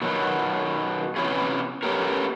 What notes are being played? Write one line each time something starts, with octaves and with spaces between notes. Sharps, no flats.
B2 D#3 F#3
C3 E3 B3 C#4 G#4
A3 B3 C#4 G4 A#4